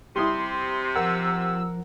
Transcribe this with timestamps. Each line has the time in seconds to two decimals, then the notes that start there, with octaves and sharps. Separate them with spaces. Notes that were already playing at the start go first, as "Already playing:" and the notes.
0.16 C3 G3 E4 C6 D#6
0.95 F3 A#4 F#5 E6